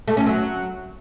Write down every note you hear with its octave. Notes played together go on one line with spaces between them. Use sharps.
A3
C#4
F#3